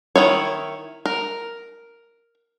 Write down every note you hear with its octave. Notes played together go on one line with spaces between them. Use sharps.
D#3 E4 C#5
A#4